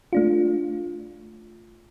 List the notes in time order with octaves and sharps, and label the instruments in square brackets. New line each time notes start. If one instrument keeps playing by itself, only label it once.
[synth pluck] A3 D4 F4